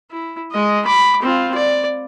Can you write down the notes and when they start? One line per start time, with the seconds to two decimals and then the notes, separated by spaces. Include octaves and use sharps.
0.11 E4
0.52 G#3 D#5
0.85 B5 D6
1.22 C4 F4
1.54 D5